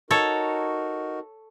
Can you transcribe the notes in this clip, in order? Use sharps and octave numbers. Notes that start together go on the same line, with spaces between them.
D#4 F#4 A4 A#4 C#5